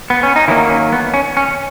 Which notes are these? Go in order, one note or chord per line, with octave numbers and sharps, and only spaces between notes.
B3
C#4
D#4
D#3 F#3 A#3 E4
C#4
B3
C#4
C#4